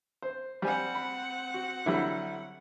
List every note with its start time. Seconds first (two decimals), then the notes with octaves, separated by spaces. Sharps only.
0.22 C5
0.62 G3 C4 C5 F#5 G#5
0.95 B5
1.54 F#4
1.86 D3 F#3 G3 E4